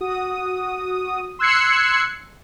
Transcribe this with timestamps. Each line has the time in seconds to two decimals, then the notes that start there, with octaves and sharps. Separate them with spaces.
0.01 F#4 D#6
1.39 C6 E6 F#6 G#6 C7 C#7